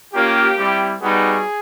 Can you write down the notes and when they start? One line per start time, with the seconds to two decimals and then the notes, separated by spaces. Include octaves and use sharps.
0.13 A#3 C#4 F4 G4
0.57 G3 C4 E4
1.01 G3 B3 D#4 F#4 G#4